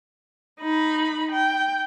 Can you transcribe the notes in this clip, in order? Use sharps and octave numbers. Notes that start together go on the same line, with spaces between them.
D#4 B5
G5